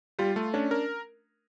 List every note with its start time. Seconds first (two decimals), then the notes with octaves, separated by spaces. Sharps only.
0.19 G3 F4
0.36 A3
0.54 C#4 D4
0.71 A#4